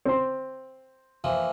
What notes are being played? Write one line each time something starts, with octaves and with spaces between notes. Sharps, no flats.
C4 C6
E3 F3 A#3